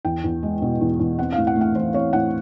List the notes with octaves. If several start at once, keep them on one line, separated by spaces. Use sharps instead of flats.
E2 G5
E2
G#3
B2
E2
E2
C4 F#5
A2 F5
F#5
A3
F#5
E3 C5
C4 C#5
A2 F#5